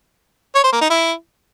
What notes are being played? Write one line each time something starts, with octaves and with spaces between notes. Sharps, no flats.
C#5
C5
A#3
D#4
E4